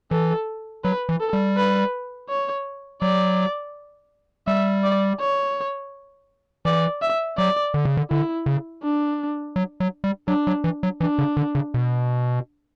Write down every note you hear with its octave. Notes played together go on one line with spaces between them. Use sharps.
E3 A4
F#3 B4
E3
A4
G3
B4
C#5
F#3 D5
G3 E5
D5
C#5
E3 D5
E5
F#3 D5
D3
C#3
D3
D3 E4
C#3
D4
F#3
F#3
G3
F#3 D4
F#3
E3
F#3
E3 D4
C#3
D3
C#3
B2